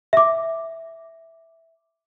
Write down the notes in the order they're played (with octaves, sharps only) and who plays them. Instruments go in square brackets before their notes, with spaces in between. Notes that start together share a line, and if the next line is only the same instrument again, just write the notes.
[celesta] E5 D6